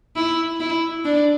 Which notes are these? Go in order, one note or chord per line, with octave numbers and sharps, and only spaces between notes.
E4
E4
D4